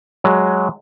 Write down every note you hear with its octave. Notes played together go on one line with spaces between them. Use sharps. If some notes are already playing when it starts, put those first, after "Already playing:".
F#3 G#3